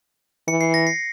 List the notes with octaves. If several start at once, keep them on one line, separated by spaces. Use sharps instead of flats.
E3 C#7
C7
A#6
C7